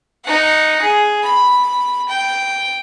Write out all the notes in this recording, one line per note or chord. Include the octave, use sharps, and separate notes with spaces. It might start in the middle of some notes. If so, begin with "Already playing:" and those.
D#4 F#5
G#4
B5
G5